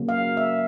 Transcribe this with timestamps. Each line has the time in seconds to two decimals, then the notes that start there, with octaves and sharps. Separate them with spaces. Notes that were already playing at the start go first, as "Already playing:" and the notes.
Already playing: C#3 F#3 A#3
0.09 F5
0.37 E5